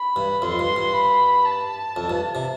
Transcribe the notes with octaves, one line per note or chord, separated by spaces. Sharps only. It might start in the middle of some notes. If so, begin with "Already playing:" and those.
Already playing: B5
G2
F2 C6
G2
G2
B5
A5
F2
G2
C3